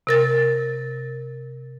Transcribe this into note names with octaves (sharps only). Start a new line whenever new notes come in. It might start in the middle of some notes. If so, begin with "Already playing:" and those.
C3 A#4 A6